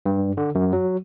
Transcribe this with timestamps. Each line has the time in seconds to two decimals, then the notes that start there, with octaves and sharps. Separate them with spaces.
0.06 G2
0.37 D3
0.55 F#2
0.73 F#3